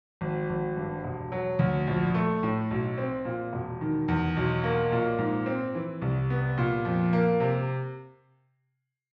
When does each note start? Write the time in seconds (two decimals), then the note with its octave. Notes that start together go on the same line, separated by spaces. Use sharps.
0.21 G#1
0.49 G#1
0.76 G2
1.04 E1
1.32 F#3
1.59 D2
1.87 A#1
2.14 A3
2.43 A2
2.71 B1
2.98 C4
3.25 A#2
3.53 E1
3.81 D#3
4.08 E2
4.37 B1
4.64 A#3
4.92 A#2
5.18 G#2
5.46 C4
5.75 E3
6.02 C2
6.30 B3
6.58 A#2
6.85 F2
7.13 A#3
7.40 C3